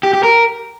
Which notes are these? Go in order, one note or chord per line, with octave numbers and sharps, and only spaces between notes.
G4
G4
A#4